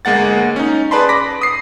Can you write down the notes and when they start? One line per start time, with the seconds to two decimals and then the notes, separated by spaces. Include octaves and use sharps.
0.05 G1 G#3 A#3 F#5 A6
0.56 C#4 D#4
0.91 G#4 B4 D5 A5 B5 C6
1.09 B5 D6 A#6 B6
1.41 D#6 C7